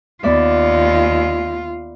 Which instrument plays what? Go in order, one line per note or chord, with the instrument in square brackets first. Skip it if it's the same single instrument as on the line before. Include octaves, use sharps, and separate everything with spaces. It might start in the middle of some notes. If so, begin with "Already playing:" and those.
[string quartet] D#2 [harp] B3 D5 E5 [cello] F4